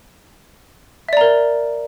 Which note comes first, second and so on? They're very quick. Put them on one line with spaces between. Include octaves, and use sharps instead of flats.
E5 D5 A#5 A#4